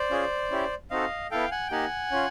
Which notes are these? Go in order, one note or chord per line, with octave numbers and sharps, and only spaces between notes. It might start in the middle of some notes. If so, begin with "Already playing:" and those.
Already playing: C5 D5
C#4 F4 G#4
C#4 E4 G4
C4 D#4 F#4 A4 D#5 F5
B3 E4 A4 F5 G5
F#5 G#5
G5
A#3 D#4 G4 F#5 G#5
C#4 F4